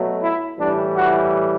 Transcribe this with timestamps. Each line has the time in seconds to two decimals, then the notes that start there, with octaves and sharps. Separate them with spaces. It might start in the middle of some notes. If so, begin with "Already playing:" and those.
Already playing: B2 F#3 A3
0.22 E4
0.59 A2 E3 G3 D4
0.96 F#4